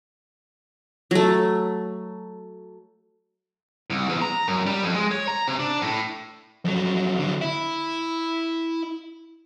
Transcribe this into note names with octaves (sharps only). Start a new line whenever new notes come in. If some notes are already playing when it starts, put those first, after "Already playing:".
F#3 A3
C2
E2
A#5
F#2
G3
F2
G#3
C#5
A#5
C3
D4
A2
F2 F#3
D3 F#3
E4